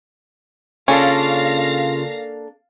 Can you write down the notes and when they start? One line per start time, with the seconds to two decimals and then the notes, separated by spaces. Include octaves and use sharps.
0.88 C#3 A#3 C#4 D4 F4 A4 F5 A#6